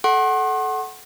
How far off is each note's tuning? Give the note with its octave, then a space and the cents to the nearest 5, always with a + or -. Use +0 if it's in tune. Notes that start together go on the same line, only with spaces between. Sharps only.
A4 -20 F#5 +15 C6 +45